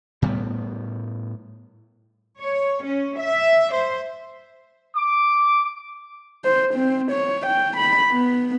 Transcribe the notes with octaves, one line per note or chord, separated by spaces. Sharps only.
A2 G3 B3
C#5
C#4
E5
C5
D6
C5
C4
C#5
G5
B5
B3